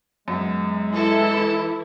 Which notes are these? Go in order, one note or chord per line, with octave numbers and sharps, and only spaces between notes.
F#2 G#3 B3
E3 E4 A4